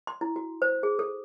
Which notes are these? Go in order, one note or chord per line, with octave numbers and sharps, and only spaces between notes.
C6
E4
F#4
C5
G#4
A4